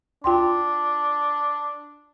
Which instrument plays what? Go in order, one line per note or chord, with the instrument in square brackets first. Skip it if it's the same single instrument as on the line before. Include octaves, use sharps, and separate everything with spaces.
[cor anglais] D4 [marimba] F4 G5 C6